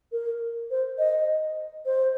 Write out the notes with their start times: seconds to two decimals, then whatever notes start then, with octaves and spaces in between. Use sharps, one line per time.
0.12 A#4
0.71 C5
0.98 D#5
1.86 C5